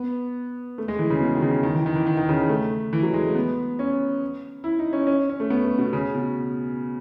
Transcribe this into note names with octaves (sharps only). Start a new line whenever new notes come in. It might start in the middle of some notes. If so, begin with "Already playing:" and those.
Already playing: B3
A3
G#3
E3
C#3
B2
D#3
C#3
D#3
E3
D#3
E3
D#3
D#3
C#3
D#3
A3
E3
F#3
G#3
A3
B3
C#4
E4
D#4
C#4
C#4
C#4
A3
B3
A3
B2
C#3
B2